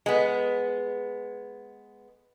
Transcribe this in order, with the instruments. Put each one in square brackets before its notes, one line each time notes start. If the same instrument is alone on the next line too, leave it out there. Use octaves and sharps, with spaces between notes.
[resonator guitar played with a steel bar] G#3 B3